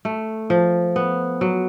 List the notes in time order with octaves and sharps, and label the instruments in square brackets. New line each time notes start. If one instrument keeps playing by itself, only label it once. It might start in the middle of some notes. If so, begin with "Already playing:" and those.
[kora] A3
F3
B3
F#3